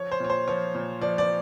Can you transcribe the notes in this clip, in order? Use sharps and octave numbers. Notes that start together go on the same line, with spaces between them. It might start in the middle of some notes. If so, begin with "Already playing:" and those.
Already playing: F3 C#5
C5
A#2 C#5
C5
F3 C#5
A#2
F3 D5
D5